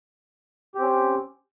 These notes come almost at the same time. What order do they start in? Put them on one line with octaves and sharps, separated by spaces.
G4 C4 C#4